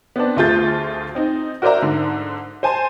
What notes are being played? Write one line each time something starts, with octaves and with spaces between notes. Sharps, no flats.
B3 C4 D4
D2 A3 F4 G#4 G6 A6
C4 D#4
F#4 A#4 C5 D5 E5 A#5
G#2 D3
C5 G#5 A5 C6